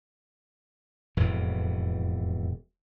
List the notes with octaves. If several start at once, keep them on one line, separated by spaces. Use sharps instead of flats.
E1 F2 A2 E3